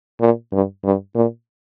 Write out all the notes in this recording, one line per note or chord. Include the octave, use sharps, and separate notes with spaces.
A#2
G2
G2
A#2